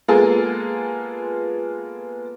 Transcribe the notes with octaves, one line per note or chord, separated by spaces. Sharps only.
G#3 A#3 B3 F4 G#4 A4